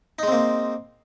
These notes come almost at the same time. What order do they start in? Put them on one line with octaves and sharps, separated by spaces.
D#4 G#3 C4 A#3